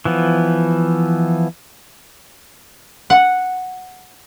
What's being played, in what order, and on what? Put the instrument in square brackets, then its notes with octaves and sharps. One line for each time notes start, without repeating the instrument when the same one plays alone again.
[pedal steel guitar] E3 F3 B3
[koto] F#5